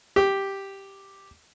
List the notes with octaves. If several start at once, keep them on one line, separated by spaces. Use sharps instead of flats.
G4